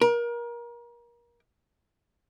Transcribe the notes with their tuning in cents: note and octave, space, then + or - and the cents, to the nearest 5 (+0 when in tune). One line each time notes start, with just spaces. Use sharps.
A#4 +30